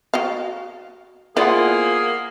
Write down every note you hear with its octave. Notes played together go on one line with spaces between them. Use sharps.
F#4 D#5 F5
A#3 B3 E4 F4 G#4 C5 D5 F#5